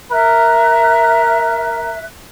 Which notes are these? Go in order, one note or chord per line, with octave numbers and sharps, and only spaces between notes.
A#4 E5 F#6